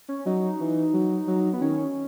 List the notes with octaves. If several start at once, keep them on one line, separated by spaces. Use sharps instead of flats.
C#4
F#3 D#4
E3
F#3
F#3
B3
D#3 C#4